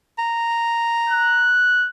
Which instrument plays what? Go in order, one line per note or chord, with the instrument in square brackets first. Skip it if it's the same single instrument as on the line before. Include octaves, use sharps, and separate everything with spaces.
[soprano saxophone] A#5
[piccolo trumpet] F#6